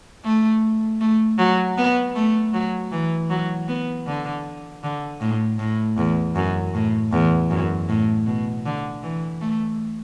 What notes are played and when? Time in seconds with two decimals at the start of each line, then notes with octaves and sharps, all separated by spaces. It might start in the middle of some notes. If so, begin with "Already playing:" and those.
0.24 A3
1.01 A3
1.39 F#3
1.77 B3
2.16 A3
2.53 F#3
2.92 E3
3.30 F#3
3.68 B3
4.07 D3
4.83 D3
5.21 A2
5.59 A2
5.98 E2
6.36 F#2
6.74 A2
7.12 E2
7.50 F#2
7.89 A2
8.26 B2
8.66 D3
9.03 E3
9.41 A3